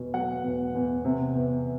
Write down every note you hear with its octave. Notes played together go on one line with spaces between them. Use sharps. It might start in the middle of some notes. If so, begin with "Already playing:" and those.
Already playing: E2 B2
F#3 F#5
E2
E2
C3
E2